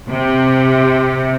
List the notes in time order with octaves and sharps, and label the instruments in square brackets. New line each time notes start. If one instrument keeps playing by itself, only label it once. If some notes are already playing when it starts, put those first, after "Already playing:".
[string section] C3